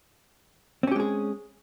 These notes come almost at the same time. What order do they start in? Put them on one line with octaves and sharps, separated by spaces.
C4 C#4 G4 G#3 G#4